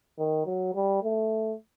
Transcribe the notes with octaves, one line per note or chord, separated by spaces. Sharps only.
D#3
F#3
G3
A3